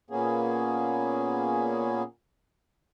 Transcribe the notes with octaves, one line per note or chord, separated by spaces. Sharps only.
A#2 A#3 B3 C#4 G#4